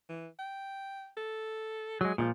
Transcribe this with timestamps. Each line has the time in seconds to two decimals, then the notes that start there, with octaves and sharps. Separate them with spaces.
0.09 E3
0.39 G5
1.17 A4
2.01 F#3 G#3 G#4
2.18 A#2 D#3 F3 G#3